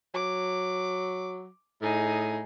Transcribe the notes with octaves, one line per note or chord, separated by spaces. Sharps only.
F#3 D6
A2 D#4 G#4